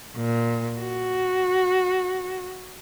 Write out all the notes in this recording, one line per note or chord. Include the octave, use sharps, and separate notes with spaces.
A#2
F#4